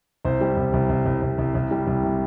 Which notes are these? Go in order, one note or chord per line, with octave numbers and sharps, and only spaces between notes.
C2 C5
G3
C2
C2
C2
C2
C2
C2
C2
G3
C2
C3